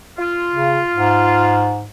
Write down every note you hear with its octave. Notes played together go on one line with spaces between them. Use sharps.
F4
C#3
G#2